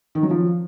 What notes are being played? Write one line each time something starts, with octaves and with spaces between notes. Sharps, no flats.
D#3
F#3
F3